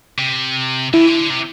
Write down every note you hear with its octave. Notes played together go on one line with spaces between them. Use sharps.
C3
D3 E4
E3
D3
C3